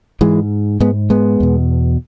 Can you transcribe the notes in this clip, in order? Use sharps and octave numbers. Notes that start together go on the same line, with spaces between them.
G#2 E3 G#3
G#2 G#3 B3
G#3 B3
E2 B2